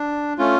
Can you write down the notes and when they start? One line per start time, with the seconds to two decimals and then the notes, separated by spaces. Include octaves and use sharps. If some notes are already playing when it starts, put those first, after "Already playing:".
Already playing: D4
0.38 A3 C#4 F4